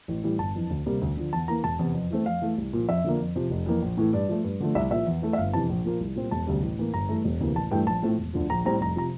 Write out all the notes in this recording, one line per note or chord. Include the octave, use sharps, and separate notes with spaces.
A1
A2 E3 G3
G1 A5
F2 E3
D2
C3 G3 A#3
D2
D3 F3
E2 A5
E3 A#3 A#5
E1 A5
E2 C3
F2
E3 A3 C4
F2 F5
E3 A3
C2
A#2 F3
F2 E5
D3 F3 A#3
F2
C3 F3
F1
F2 E3 A#3
A#1
A2 E3 A3
G2 D5
F3 A3
G2
D3 F3 A3
C2 E5
A#2 F3 E5
E2
E3 A3
E5
G1 F5
F2 C3 E3 A5
A#1
A#2 F3 A#3
C2
A#2 G3 C4
E1 A5
D2 C3 G3
A1
A2 E3 A#3
G1 A#5
G2 E3 A3
E1
D2 C3 E3 A#3
A1 A5
G2 E3 A3 G5
A#1 A5
A2 F3 A3 C4
E1
D2 D3 F3
A#1 A#5
A2 G3 C4 A#5
F1 A#5
C3 F3 A#5